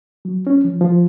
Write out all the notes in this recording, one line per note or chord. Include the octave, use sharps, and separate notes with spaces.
F#3
C#4
F3
F3